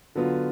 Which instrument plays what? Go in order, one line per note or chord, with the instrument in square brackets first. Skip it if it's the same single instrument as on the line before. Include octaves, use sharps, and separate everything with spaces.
[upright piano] D3 F#3 B3 F4